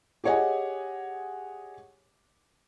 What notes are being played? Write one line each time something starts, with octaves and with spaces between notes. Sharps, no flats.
G4 G#4 C#5 D#5 F#5 G#5